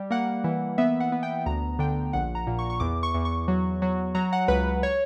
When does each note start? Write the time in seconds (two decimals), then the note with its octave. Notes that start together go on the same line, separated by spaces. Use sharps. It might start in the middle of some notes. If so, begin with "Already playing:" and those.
Already playing: G3
0.11 A#3 F#5
0.44 E3
0.78 B3 E5
1.00 F#5
1.12 B3
1.23 G5
1.46 D2 A#5
1.79 D3 G5
2.13 A#1 F#5
2.35 A#5
2.47 A#2
2.59 C#6
2.70 C#6
2.80 E2 D6
3.03 C#6
3.14 E2
3.25 C#6
3.48 F#3
3.82 F#3
4.15 F#3 A#5
4.33 F#5
4.48 C#2 B4
4.83 C#5